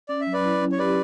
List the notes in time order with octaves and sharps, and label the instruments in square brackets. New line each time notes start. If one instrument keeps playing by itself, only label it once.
[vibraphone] C#4 [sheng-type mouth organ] D5
[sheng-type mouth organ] E5
[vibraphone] F#3
[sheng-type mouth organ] B4 D5
[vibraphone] E4
C#4
[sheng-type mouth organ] C#5
[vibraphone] G4 [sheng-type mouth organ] B4 D5